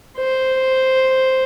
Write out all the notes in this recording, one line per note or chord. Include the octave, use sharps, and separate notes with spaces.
C5